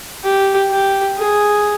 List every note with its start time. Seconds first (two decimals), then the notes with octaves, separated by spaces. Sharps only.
0.24 G4
0.71 G4
1.18 G#4